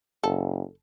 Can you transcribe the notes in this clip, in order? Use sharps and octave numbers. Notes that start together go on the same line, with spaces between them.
F#1 A4